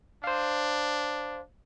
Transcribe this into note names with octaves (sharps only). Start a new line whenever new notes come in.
D4 C5 F5